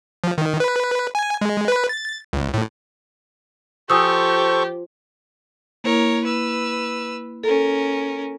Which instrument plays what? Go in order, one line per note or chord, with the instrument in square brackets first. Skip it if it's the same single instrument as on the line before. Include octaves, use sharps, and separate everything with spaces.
[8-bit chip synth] F3
D#3
B4
G#5
G#3
B4
A6
C#2
A2
[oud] F3 [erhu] G4 [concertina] A4 C5 C#6 [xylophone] G#5 D#6 E6
[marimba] A#3 E4 [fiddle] A#4 C#5
[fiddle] B4 E6
[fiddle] C#4 A#4 [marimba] A4